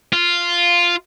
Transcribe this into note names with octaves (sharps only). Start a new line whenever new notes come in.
F4